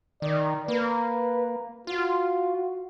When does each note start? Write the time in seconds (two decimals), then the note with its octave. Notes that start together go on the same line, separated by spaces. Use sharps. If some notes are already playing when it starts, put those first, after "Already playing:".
0.22 D#3 D5
0.68 A#3 B4
1.87 F4 F#4